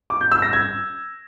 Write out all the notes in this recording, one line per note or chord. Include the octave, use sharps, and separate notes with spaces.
D6
G6
E6
A#6
G#6